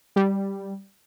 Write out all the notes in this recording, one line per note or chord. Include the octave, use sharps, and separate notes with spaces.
G3